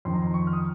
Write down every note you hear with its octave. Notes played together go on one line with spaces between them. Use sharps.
F2 D#3 C6
A#5
C6
C#6
F6
D#6